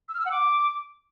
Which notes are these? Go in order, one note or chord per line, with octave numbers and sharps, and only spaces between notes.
E6
F6
E6
F#5
D6